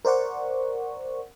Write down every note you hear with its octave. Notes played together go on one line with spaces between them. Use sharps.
A#4 C5 D5 F#5 C#6